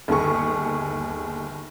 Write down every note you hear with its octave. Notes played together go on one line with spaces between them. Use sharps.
G1 D#2 G#4 C#6